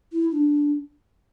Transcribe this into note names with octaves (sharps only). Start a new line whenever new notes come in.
E4
D4